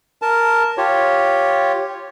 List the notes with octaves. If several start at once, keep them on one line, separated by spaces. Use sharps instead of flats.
A#4 A5
F4 G4 C#5